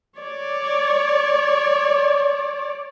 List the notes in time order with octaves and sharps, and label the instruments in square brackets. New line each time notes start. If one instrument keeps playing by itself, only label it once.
[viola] C#5 D5